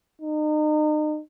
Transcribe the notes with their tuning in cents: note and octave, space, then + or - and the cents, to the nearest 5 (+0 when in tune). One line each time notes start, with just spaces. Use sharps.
D#4 -35